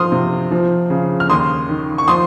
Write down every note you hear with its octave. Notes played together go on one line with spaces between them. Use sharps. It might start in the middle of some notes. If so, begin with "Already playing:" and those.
Already playing: F3 C6 D#6 F6
C3
F3
C#3
F6
D#2 C6 D#6
D#3
C#6
F3 C6 D#6